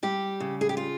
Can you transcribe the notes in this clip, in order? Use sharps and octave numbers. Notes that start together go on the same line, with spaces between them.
G3 G4
C#3
G#4
G4
F4